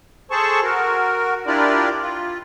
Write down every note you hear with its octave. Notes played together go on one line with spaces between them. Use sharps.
G#4 A4 C5 A5 C#6
F#4 A#4
D4 E4 F4 G4 A#4 D5
F4